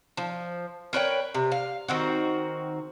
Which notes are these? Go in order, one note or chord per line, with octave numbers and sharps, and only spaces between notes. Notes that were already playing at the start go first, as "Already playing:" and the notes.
F3
A#4 B4 C#5 G5
C3
F5
D#3 C4 F#4